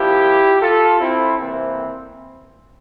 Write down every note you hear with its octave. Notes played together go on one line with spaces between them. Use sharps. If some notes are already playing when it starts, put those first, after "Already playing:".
Already playing: C2 A#2 F3 E4 G4
F4 A4
C4 E4
C2 C3 E3 A#3 C4